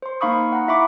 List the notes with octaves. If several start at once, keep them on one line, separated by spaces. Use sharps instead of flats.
C5 C6
A#3 D#4 F5 B5 C#6 D#6
F#5 A#5 C#6
E4 E5 A#5 B5 C#6 D6